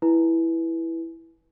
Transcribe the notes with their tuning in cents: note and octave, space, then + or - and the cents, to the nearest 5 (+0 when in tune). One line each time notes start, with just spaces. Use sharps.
E4 +0 B4 -15 G#5 +25